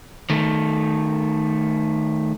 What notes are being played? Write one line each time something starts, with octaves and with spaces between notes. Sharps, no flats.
D#3 A3